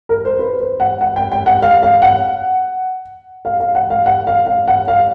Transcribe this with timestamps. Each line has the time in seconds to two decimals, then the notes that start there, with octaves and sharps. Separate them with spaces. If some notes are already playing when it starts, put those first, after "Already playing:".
0.09 A#4
0.25 C5
0.39 B4
0.61 C5
0.80 F#5
1.01 F#5
1.16 G5
1.32 G5
1.46 F#5
1.62 F5
1.83 F5
2.02 F#5
3.45 F5
3.60 F5
3.75 F#5
3.90 F5
4.06 F#5
4.27 F5
4.46 F5
4.68 F#5
4.88 F5